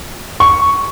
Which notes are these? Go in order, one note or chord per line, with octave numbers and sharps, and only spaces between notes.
C#6